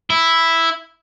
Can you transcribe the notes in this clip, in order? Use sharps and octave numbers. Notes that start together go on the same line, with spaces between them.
E4